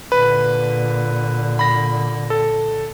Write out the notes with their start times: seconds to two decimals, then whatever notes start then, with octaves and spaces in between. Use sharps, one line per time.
0.12 A#2 D3 B4
1.59 B5 A#6
2.30 A4